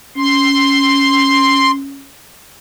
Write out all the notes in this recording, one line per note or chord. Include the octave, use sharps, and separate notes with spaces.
C#4 C6